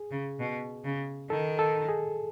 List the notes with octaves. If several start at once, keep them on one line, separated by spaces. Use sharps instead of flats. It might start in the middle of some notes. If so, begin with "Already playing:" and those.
Already playing: G#4
C#3
B2
C#3
D#3 A4
A4
G#4